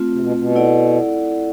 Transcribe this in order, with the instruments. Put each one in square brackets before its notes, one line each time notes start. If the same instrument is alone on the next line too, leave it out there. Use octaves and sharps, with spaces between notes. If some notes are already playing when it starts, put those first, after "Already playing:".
Already playing: [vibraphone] A3 C4 F4
[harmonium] C3
B2
B2
[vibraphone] E4 A4 D5 F#5